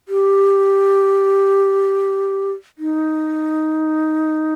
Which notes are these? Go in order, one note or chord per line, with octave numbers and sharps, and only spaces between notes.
G4
D#4